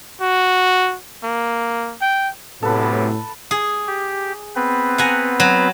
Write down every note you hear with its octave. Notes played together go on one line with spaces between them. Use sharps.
F#4
A#3
G5
F#2 A2 C3 B3 A4 B4
G#4
G4
B3 C4 B4
F#5 G#5 A#5
F#3